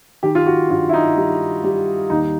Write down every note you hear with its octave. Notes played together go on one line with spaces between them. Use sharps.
D#3 G4
F4
F#4
G2 F4
E4
D#4
G3
G3
D#2 D#4